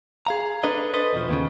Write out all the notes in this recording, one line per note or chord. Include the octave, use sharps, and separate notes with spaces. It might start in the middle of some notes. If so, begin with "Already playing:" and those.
G#4 F5 A#5
D4 A4 B4 D#5
A4 B4 C5 D#5
E2 B2 F3
D#2 A#2 C#3